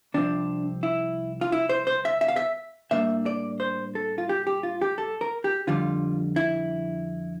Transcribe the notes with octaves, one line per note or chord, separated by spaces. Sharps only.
C2 C3 F3 C4 D4
E4
F4
E4
C5
C5
E5
E5
F5
E5
A2 G3 A#3 D4 E5
D5
C5
A4
F4
G4
G4
F4
G4
A4
A#4
G4
F2 D3 G3 F4
E4